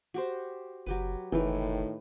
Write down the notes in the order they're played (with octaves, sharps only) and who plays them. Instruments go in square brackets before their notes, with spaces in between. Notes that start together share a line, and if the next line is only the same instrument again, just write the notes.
[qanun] F#4 G4 C5
[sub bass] F#1 [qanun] F#3 G4 B4
[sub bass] F#1 [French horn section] A2 D#3 [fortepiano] E3 [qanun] B4 G5